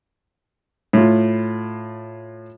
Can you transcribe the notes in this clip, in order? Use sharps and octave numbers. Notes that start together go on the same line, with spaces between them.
A2 F4